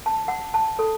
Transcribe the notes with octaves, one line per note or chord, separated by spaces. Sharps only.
A5
F#5
A5
A4